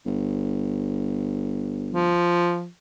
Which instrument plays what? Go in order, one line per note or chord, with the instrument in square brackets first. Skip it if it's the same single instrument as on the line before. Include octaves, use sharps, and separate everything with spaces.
[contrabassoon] G1
[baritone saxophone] F3